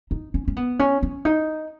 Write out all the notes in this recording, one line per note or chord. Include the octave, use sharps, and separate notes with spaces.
D#4
C#4
C#4
B3
C#4
C#4
D#4